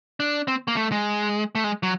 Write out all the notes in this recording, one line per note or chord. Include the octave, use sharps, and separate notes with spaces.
D4
C4
A#3
A3
G#3
A3
G#3
F#3